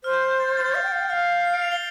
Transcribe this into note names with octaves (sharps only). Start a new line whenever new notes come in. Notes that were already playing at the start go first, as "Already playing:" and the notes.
C5 F6
G6
F6
G6
A6
A6
G6
F5 F6
G5
F5 G6
G5
F5 F6
G6
C7
D7
F7
G7